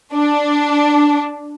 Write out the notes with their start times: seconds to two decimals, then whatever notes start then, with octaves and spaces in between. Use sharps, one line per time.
0.13 D4